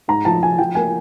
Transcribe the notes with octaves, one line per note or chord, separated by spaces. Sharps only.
G#2 A#5
F3 A5
F3 G#5
F3 G5
A#3 G#5